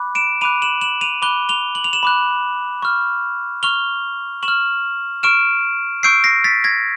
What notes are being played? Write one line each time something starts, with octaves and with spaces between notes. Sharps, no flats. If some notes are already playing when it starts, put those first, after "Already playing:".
Already playing: B5 D6 F#6
D7 E7
B5 D6 F#6 D#7 F7
E7 F#7
E7 F#7
D#7 F7
B5 D6 F#6 F7 G7
F7 G7
F#7
F7
E7 F#7
B5 D6 F#6
C#6 F6
C#6 F6 F7 G7
C#6 E7 F#7
F6
C#6 F6 D7 E7
C#6 E6 G6 C7 D7
A#6 C7
A6 B6
G#6 A#6